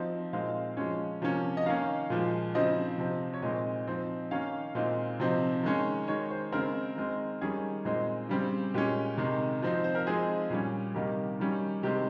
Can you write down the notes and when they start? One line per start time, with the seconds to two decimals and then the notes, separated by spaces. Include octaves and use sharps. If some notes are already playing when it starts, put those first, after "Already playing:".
Already playing: F3 C4 D#4
0.33 A#2 G#3 C4 D#4 F5
0.77 F3 G#3 C#4
1.22 C3 F3 A#3 C#4
1.57 D#5
1.66 D#3 A#3 C#4 F5
2.10 A#2 F3 G#3
2.54 C#3 F3 C4 D#4 D#5
2.98 C3 F3 C4
3.34 C#5
3.42 A#2 G#3 C4 D#4 D#5
3.87 F3 C4 D#4
4.31 D#3 A#3 C#4 F5
4.75 A#2 G#3 C4 D#4
5.20 C3 F3 C4 D#4
5.63 D#3 G#3 C#4
6.08 D#3 G#3 D#4 C#5
6.31 C5
6.52 C#3 G#3 C4 A#4
6.96 D#3 G#3 C4
7.41 D#3 G3 C#4 G#4
7.85 A#2 G#3 C4 D#4
8.29 C#3 G3 C4
8.74 A#2 G#3 C#4 G4
9.17 C3 D#3 G#3
9.62 F3 C4 D#4
9.73 C5
9.84 C5
9.95 A#4
10.06 F3 G#3 C4 D#4 G#4
10.50 A#2 G3 C#4
10.94 C3 D#3 G3 A#3 D#4 G4
11.40 D#3 G3 C#4
11.83 C3 D#3 G#3 C4 G4